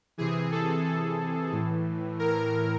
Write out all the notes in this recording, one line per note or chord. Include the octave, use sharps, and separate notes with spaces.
C3 E3 G#4
A4
A4
A2 E3
A#4